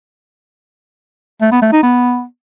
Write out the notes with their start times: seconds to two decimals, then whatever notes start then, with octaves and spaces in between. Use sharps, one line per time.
1.41 A3
1.52 B3
1.62 A3
1.72 D#4
1.83 B3